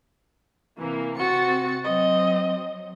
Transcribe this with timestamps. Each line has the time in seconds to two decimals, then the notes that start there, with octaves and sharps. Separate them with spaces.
0.79 C3 E3 A#3
1.19 C3 C4 F#4 A6 C#7
1.84 F#3 C4 D#5